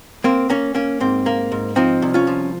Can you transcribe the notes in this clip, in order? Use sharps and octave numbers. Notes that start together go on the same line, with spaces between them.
A#3 C4
A#3 C#4
A#3 C#4
G#2 C4
A#3
G#2
F3 C4 D#4
C2
C#4 F4
F3